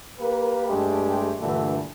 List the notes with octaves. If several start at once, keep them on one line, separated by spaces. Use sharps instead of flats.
A#3 G4 A#4 B4
G2 G#3 A3 G4
G2 A#2 D3 E3 A3